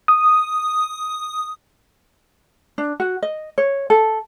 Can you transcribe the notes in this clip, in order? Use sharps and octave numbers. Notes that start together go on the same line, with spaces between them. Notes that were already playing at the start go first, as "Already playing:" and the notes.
D#6
D4
F#4
D#5
C#5
A4